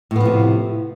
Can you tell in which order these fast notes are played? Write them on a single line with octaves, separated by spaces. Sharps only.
A2 B3 F3 C3